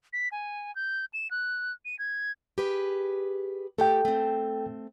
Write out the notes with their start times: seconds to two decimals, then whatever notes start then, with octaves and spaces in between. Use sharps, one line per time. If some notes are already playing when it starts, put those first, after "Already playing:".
0.13 B6
0.32 G#5
0.76 G6
1.13 E7
1.31 F#6
1.85 D#7
1.99 G#6
2.58 G4 G#4 B4
3.78 A3 G4 A4 G5
4.05 A3 C4